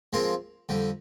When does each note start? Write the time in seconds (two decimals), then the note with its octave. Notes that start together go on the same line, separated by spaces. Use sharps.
0.13 F3 G#3 C4 F4 A#4
0.69 F2 D3 G3